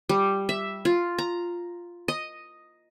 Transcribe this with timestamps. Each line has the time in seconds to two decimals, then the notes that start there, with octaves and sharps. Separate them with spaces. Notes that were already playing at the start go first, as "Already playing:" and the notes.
0.09 G3
0.49 E5
0.85 F4
1.18 A#5
2.08 D#5